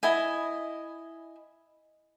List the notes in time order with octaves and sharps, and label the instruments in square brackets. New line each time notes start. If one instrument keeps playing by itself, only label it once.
[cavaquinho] E4 D#5 G#5